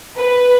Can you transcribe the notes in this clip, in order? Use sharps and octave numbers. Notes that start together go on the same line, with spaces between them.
B4